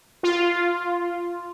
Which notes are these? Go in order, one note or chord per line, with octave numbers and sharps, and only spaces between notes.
F4